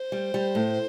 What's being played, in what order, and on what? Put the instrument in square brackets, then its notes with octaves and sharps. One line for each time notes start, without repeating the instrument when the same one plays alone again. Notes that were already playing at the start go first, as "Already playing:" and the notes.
Already playing: [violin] C5
[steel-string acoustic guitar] G3
G3
A2